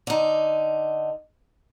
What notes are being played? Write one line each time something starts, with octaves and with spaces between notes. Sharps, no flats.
D3 D#4